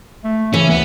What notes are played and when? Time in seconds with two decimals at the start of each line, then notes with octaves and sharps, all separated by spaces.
0.24 A3
0.54 C#3 E3 C#4
0.71 D2 B3